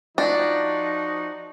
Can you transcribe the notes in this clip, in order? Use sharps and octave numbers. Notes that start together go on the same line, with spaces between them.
F3 D4 D#4 F#4